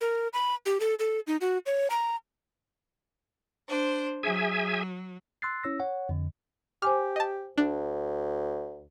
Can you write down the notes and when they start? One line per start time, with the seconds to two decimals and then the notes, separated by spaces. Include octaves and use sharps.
0.01 A#4
0.33 B5
0.66 G4
0.80 A4
0.99 A4
1.27 D#4
1.41 F#4
1.66 C#5
1.90 A#5
3.68 D4 C5
4.23 F#3 G#4 E5 G#5
5.42 C6 E6 F#6 A6 C7
5.63 C#4 E4 C#5 E6 A#6
5.80 C#5 F#5
6.09 F2 D3
6.82 G4 C5 G#5 D6 F6
7.16 D#5 A5
7.58 D2 D4